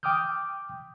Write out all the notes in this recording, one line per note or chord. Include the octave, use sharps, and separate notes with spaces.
G5 D6 D#6 F6 G6